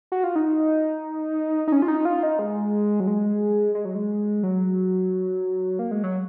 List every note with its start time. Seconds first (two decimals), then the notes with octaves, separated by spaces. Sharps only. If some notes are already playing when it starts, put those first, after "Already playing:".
0.12 F#4
0.24 F4
0.36 D#4
1.68 D#4
1.72 C#4
1.82 F4
1.88 D#4
2.05 F4
2.23 D#4
2.39 G#3
3.00 F#3
3.07 G#3
3.75 G#3
3.85 F#3
3.95 G#3
4.43 F#3
5.79 A#3
5.91 G#3
6.04 F#3